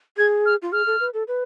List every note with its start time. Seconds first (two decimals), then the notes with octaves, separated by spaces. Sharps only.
0.17 G#4 G#6
0.46 F6
0.62 F4
0.72 G#4 F6
0.86 A4
1.00 B4
1.14 A4
1.28 B4